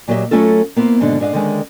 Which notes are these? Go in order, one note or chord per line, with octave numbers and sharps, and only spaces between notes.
A#2 F#3 G4 B4 D#5 E5
F#3 A3 C#4 F4 A4
A#3 B3 E4 C5
D#2 G#2 B2 D3 D4
G#2 D4 D#5 F5
D3 D#3 G#3 C#4